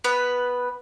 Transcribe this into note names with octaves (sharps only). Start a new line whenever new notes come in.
B3 B4